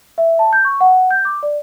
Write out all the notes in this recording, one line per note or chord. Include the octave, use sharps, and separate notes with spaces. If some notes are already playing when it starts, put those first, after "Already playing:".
E5
A5
G6
C#6
F#5
G6
D6
D5